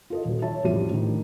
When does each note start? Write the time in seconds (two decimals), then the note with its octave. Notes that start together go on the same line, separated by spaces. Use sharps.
0.10 F4 A4 D#5
0.25 D#1 F#3
0.42 C#5 E5 A5
0.64 A1 F2 G3 G4 D#7
0.91 A2 D3 D#3